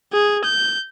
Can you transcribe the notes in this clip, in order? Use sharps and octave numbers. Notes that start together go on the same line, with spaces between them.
G#4
G6